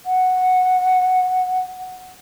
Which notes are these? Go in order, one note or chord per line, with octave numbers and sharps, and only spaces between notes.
F#5